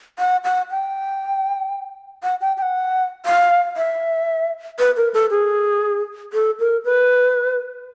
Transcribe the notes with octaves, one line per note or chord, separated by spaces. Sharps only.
F#5
F#5
G5
F#5
G5
G5
F#5
F5
E5
B4
A#4
A4
G#4
A4
A#4
B4